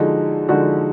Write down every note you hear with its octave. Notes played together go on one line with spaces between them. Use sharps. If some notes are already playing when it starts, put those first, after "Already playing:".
Already playing: D3 F3 G#3 D#4 F#4
D3 F3 G#3 D#4 F#4